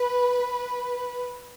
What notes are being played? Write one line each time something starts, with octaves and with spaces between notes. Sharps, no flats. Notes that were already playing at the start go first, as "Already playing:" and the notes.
Already playing: B4